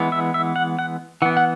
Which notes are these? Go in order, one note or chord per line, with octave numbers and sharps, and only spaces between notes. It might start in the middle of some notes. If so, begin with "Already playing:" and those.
Already playing: E3 G#3 B3
E5
E5
F#5
F#5
E3 B3 F#5
F#5